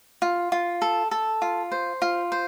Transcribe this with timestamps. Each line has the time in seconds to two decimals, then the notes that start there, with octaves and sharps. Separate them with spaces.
0.22 F4
0.52 F4
0.82 A4
1.11 A4
1.42 F4
1.72 C5
2.02 F4
2.32 C5